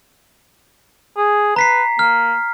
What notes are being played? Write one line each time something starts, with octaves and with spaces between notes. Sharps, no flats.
G#4
B4 A#5 B6 C7
A#3 F6